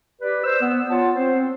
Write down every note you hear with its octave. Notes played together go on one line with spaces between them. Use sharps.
G4 B4 D5
C5 E6
B3
F4 C#5 F#5 A5
C4 C5